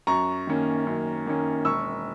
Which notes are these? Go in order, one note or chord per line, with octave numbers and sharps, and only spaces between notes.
F#2 A#5 C#6
D#3 A#3 C#4
F#2
D#3 A#3 C#4
E1 C#6 E6